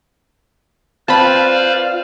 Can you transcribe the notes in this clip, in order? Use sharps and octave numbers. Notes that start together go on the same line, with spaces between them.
C4 F4 B4 C5 D5 F5 A5 B5